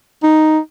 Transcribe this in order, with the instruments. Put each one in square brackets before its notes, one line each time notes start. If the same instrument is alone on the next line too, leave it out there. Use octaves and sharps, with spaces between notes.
[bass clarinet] D#4